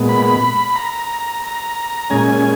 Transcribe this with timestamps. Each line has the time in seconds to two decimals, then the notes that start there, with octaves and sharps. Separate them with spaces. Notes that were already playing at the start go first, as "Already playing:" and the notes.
Already playing: A#2 G#3 B3
0.09 B5
0.76 A#5
1.44 A#5
2.10 A#2 G#3 C#4 G#5